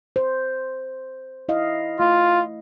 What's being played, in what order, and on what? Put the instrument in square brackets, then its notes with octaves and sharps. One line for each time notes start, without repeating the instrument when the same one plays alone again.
[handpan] C5
E4 D#5 F5
[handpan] A3 [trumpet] F4